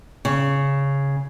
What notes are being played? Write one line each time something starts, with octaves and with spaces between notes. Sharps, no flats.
C#3